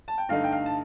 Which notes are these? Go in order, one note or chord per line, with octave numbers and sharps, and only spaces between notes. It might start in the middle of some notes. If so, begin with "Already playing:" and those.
A5
G5
G2 D3 A3 D#4 F5
G5
F5
A5